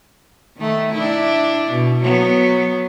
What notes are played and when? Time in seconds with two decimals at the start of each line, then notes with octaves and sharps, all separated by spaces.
0.57 D#3 A3
0.93 D4 E4
1.72 B2
2.03 F#3 B3